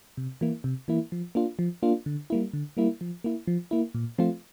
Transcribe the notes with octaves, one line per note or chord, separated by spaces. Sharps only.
C3
E3 A#3 E4
C3
E3 A#3 E4
F3
A#3 D4 F4
F3
A#3 D4 F4
D3
G3 A#3 E4
D3
G3 A#3 E4
F3
A#3 E4
F3
A#3 E4
A#2
F3 A3 C4 F4